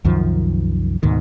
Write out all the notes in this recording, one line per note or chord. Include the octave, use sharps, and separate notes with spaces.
C2 F#2 D#3 F3
D2 G#2 B2 D#3